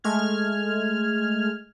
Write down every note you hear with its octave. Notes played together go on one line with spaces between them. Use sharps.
G#3 A3 F6 G#6